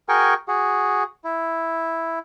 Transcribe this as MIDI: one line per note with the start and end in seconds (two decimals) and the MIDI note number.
0.09 0.34 66
0.09 0.34 68
0.09 0.34 70
0.09 0.34 79
0.09 0.34 80
0.09 0.34 85
0.48 1.03 66
0.48 1.03 68
1.24 2.19 64